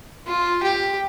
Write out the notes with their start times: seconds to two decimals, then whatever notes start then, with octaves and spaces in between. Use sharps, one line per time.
0.27 F4
0.63 G4